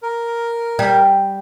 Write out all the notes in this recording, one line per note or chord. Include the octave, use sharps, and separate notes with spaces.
A#4
G3